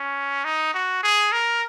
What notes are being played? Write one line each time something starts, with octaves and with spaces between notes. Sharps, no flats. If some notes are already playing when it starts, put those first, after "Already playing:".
Already playing: C#4
D#4
F#4
G#4
A#4